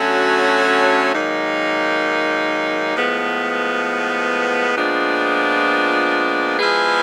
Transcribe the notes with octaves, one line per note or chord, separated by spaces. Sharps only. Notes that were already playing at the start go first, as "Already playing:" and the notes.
Already playing: D3 F#3 A3 C#4 F#4
G#2 D#3 F#3 A#3 D#4
A2 F3 G#3 B3
A#2 F3 G#3 B3 D4
F3 G#3 B3 E4 G#4